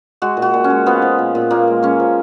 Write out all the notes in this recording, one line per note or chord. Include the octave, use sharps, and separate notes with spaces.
G#3 F#4
A#2
F#4
A#2
C#4
G#3
F3 B3
F3
A#2
A#2
A#2 A#3
G#3
G#3 C#4
F3